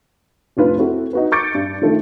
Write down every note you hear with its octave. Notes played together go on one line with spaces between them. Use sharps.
F1 D4 F4 B4
C4 E4 F#4 A4
D#4 F#4 B4
C#6 D6 G6 A6 C#7 D7
G2
D#3 A3 D4 F4